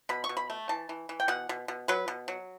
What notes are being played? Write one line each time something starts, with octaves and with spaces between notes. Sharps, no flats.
B2 B5
C#6
B2
B5
A3
E3 A5
E3
E3
G5
B2 F#5
B2
B2
F#3 B4
B2
F#3